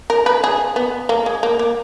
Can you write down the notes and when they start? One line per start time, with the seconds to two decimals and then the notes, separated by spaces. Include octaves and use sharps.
0.10 A#4
0.26 B4
0.44 G#4
0.76 B3
1.09 A#3
1.26 G#3
1.43 A#3
1.59 A#3